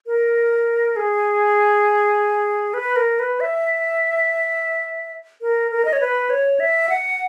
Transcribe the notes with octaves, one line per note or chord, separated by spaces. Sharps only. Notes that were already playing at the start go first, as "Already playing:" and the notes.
A#4
G#4
B4
A#4
B4
E5
A#4
A#4
D#5
C#5
B4
C#5
E5
F#5